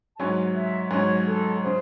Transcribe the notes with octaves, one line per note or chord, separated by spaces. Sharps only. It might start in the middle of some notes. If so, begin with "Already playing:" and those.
A5
G#2 F#3 C#4 G#5
E5
G#2 F#3 C#4 C#5
A4
C#3 C5